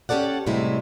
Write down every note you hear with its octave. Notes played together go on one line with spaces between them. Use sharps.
C#4 G4 A4 D5 F#5
F#2 A2 C3 G3 G#3 E4